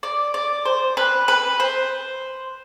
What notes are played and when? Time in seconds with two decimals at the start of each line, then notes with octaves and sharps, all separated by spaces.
0.03 D5
0.34 D5
0.65 C5
0.97 B4
1.28 B4
1.60 C5